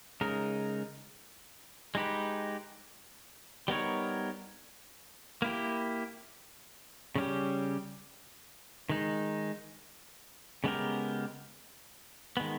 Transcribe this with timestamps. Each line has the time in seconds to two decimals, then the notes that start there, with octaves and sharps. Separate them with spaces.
0.21 C#3 G#3 D#4 A#4
1.95 G#3 D#4 G4 B4
3.68 G3 B3 D#4 A#4 C#5
5.42 A#3 E4 G4
7.16 C#3 G3 C#4 G4
8.89 D#3 G#3 D#4
10.64 C#3 G#3 B3 G4 A#4
12.37 D#3 G#3 B3